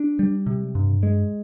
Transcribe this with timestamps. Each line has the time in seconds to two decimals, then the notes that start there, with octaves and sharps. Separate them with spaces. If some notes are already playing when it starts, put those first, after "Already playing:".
Already playing: D4
0.19 G3
0.46 C3
0.75 G2
1.03 G#3